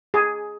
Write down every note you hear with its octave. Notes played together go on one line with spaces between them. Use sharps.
G#4